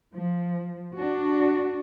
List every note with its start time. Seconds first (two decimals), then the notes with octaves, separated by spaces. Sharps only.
0.14 F3
0.97 D4 F#4